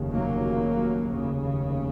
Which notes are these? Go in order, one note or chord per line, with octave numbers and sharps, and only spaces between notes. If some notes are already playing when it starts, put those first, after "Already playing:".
Already playing: F1 D#2 C#3
F#3 A#3
F1 D#2 C#3